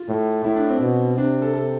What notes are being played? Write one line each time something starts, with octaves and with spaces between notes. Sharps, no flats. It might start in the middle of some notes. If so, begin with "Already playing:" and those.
Already playing: F4
A2
A2 E4
D4
C4
B2
C3 D4
A4
A4